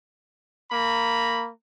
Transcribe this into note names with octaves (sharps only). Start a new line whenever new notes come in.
A#3 A#5 B5